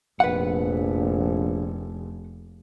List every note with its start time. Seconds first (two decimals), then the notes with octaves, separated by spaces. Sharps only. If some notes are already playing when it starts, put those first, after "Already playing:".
0.20 F1 A#1 B4 F#5